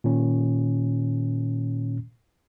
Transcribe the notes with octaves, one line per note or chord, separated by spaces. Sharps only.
A#2 D#3 C#4